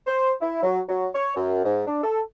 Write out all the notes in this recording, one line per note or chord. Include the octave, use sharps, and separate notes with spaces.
C5
E4
F#3
F#3
C#5
F#2
G#2
D4
A4